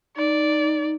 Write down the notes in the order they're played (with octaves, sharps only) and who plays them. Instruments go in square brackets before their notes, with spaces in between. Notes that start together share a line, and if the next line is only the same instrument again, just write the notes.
[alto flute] D#4 [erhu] D5